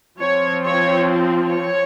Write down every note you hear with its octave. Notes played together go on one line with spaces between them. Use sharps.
F3 C4 C#5
C#5
C#5